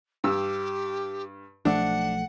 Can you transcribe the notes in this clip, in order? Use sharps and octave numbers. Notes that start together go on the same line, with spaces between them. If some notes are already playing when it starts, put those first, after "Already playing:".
G2 G4 E6
B1 F3 A3 D4 F#5